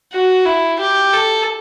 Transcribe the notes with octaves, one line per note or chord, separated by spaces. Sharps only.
F#4
E4
G4
A4